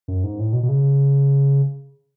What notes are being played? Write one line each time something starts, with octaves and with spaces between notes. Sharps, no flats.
F#2
G#2
A2
B2
B2
C#3